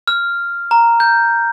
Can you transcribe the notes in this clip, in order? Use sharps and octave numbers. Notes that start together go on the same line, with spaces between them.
F6
A#5
G6